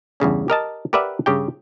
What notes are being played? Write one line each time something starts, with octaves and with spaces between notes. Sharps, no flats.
E2 G2 C#3 C#4
G4 A#4 D#5 A5
G4 A#4 B4 D5 E5 F#5
G2 C#3 G4 G5